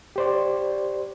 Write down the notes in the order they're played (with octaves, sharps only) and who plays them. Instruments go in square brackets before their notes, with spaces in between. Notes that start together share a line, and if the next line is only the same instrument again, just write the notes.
[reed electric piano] G4 C5 D5